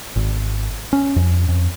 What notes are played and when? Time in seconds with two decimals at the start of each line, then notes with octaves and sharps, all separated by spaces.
0.16 G#1
0.93 C#4
1.16 F2
1.48 F2